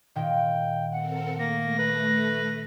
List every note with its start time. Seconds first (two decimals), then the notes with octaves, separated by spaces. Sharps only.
0.15 A#2 D#3 G5
0.92 C4 A4 A#4 F#5
1.38 A3 A#3 A#6
1.78 B4